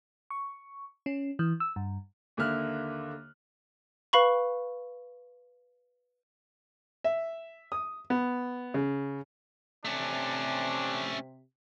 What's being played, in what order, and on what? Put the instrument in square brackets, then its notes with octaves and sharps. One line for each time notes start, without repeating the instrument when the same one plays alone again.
[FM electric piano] C#6
C#4
E3
E6
G2
[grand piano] D#2 D3 A#3 E5 F6 F#6
[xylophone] B4 F5 B5 C#6
[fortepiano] E5
D#6
B3
C#3
[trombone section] C3 [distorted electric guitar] A3 C#4 [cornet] D4